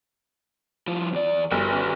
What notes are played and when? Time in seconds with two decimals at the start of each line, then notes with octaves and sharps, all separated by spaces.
0.87 F3 E4 F4
1.13 E2 D5
1.52 G1 F#4 A4 A#4
1.71 C#4 F#4 B4